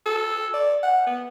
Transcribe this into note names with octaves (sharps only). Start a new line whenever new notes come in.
A4
D5
F#5
B3